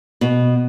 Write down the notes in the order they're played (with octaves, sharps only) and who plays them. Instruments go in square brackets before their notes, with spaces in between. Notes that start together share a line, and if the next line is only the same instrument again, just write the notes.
[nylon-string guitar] B2